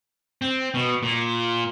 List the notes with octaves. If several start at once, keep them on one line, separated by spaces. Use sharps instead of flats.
C4
B2
A#2